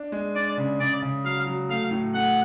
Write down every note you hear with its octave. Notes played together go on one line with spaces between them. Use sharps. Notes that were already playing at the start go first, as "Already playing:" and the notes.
Already playing: D4
G#3
D4 D5
C#3
C#3 D5
C#3
F#3 F5
F#3
A3 F5
A2
A3 F#5